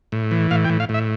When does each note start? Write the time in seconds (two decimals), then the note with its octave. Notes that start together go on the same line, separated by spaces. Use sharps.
0.12 A2
0.31 E3
0.51 A2 F5
0.65 G5
0.69 A2
0.80 F5
0.89 A2
0.94 E5